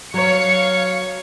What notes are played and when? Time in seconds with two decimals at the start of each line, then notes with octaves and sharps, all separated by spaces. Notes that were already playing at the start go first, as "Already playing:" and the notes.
0.14 F#3 C#5 F5 C#7